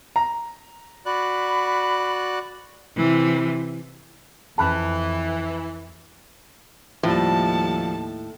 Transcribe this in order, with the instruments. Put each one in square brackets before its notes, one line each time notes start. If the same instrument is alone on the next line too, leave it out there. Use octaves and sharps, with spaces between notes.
[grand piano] A#5
[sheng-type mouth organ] F#4 D5 F#6 [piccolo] B5
[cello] C3 E3
[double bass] F2 [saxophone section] E3 [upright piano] A5 B5 F#6
[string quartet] D#2 A5 [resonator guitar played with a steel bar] A2 [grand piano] F3 G3